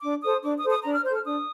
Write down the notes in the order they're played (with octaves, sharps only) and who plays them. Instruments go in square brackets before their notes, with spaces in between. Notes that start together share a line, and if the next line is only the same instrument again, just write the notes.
[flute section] D4 D6
A4 C5 D#6
D4 D6
D#6
A4 C5
D#6
D4 A#5
F6
C5 G6
A4
F6
D4 D#6